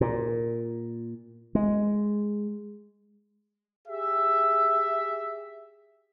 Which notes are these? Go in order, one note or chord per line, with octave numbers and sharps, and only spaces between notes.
A#2
G#3
G4 G#4 E5